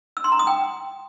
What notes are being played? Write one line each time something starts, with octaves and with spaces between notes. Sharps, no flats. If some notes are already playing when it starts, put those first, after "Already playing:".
E6
C6
A#5
D#6
G5